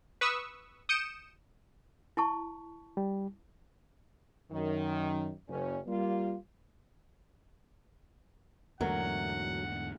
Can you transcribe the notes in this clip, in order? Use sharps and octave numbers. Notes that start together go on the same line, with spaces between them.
B4 C#6 D#6 E6
D#6 G6 C#7 D7 E7
E4 A5 C#6
G3
F#2 D#3
F#1 C#4
G3 A#3 F4
E2 G#2 D3 F#3 A3 A#4 F#5